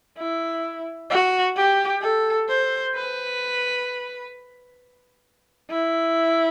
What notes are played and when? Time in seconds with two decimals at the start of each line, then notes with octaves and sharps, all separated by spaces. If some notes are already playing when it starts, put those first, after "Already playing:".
0.17 E4
1.10 F#4
1.56 G4
2.01 A4
2.48 C5
2.94 B4
5.70 E4